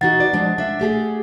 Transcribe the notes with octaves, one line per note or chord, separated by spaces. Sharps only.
E3 D#4 F#4 F#5 A6
D5
F3 G#3 D4
D4 E5
A3 G4 G#4